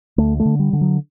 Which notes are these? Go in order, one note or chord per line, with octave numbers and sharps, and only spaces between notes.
D2 A3
A3
D3
G3
D3
F#3